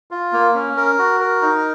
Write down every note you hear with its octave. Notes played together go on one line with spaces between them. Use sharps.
F4
A#3
C#4
A#4
F#4
A#4
D#4